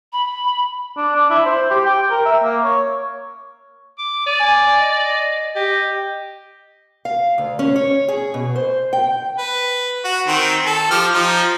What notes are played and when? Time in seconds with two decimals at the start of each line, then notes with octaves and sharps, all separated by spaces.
0.13 B5
0.97 D4
1.16 D4
1.30 E4
1.46 C5
1.71 G4
1.86 G5
2.11 A#4
2.25 E5
2.43 A#3
2.64 C#5
3.98 D6
4.27 D5 D#6
4.40 G#5
4.80 D#5
5.56 G4 D#5
7.05 F5
7.38 D2
7.59 C#4
7.76 C#5
8.08 G#4
8.34 B2
8.56 C5
8.93 G5
9.38 B4
10.05 F#4
10.28 D#3 C4
10.66 A4
10.91 F3 G4 F6
11.14 F3 D#4